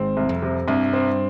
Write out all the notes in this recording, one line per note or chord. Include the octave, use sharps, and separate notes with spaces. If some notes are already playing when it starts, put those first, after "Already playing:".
Already playing: G#1 G#2 C4
C2
F2
C3
C2 G2
C4